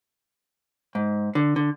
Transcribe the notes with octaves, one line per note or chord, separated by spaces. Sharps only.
G#2
D3
D3